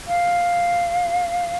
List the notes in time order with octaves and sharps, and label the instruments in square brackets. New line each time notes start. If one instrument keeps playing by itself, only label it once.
[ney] F5